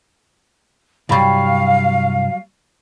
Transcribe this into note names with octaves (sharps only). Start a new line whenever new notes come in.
C2 G2 F#3 G3 F5 B5